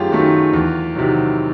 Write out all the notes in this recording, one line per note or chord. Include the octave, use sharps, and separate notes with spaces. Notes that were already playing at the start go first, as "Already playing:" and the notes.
Already playing: F#2 D#3 F#3 A3 F4 G4 G#4
D#3 F#3 A3
E2
C3 D#3 F#3